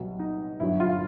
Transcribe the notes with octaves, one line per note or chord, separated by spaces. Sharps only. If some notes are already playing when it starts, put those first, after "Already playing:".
Already playing: C2 B2 F#3
D#4
G1 F#2 D3 F#3 E4
F4